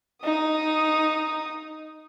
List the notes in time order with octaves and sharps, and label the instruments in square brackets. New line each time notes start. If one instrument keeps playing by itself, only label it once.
[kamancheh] D#4 D#6